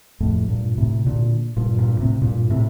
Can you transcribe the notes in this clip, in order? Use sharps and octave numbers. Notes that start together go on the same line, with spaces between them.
F2 A2
G2 A#2
A2 C3
A#2 D3
G2 A#2
G2 A#2
A2 C3
G2 A#2
A2 C3